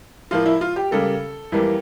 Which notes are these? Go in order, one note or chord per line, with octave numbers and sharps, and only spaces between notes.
A2 F3 A#3 F4
E4
F4
G4
C#3 G3 A#3 A4
F2 E3 G3 A#3